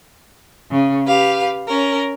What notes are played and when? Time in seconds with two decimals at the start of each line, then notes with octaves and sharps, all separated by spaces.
0.71 C#3
1.07 G4 B4 F5
1.68 C#4 A#4